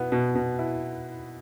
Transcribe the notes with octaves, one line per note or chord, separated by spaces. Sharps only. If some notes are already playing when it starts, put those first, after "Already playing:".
Already playing: B2 B3 E4
B2
B2
E4